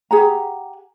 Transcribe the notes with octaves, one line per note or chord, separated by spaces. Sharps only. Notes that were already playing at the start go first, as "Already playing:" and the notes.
G4 G#4 F#5 A#5